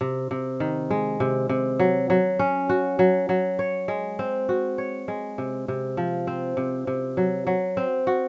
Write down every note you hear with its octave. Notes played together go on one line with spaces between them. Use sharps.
C3
C3
D#3
G#3
C3
C3
F#3
F#3
C#4
F#4
F#3
F#3
C#5
G#3
C4
F#4
C#5
G#3
C3
C3
F3
C4
C3
C3
F#3
F#3
C4
F#4